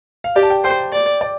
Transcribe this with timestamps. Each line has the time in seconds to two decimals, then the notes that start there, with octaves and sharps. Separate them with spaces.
0.24 F5
0.36 G4 D5
0.43 A5
0.50 G5
0.64 C5 G5
0.93 D5
1.21 D5